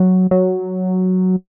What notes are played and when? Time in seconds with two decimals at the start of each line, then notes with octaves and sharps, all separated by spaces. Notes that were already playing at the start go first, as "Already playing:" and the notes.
Already playing: F#3
0.31 F#3